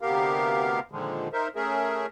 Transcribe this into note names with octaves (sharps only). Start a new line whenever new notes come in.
D2 C3 B3 G4 A#4 F5
A#2 D3 D#3 F3 G#3
D#4 A#4 C5 E5
A3 C#4 G#4 A#4 E5